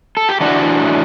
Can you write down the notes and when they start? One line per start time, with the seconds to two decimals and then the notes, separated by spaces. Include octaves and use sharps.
0.17 A4
0.29 G4
0.41 E3 D4 F#4
0.80 A2